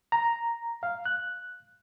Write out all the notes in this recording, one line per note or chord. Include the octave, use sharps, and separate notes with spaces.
A#5
F5
F#6